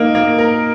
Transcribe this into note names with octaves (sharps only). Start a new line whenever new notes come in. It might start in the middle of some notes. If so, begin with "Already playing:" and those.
Already playing: A#3 D#4 A#4
A#3
A#4